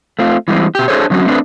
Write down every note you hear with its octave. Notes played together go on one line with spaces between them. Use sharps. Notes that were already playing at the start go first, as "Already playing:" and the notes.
A3 C4 F4
E3 G3 G#3 C4
B2 G4
D4 G#4 A4 C5 C#5
D3 F#3 C4 C#4 F#4
A3 C4 D4 B4